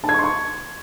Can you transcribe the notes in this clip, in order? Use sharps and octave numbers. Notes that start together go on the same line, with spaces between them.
A5
G#6
C#6
C6
C#6